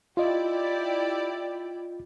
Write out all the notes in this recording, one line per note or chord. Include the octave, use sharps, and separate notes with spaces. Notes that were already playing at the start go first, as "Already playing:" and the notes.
E4 F4 G4 D5 D#5